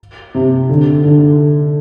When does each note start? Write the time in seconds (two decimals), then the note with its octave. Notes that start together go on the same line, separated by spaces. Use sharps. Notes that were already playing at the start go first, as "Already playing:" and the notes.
0.35 C3
0.69 D3
1.04 D3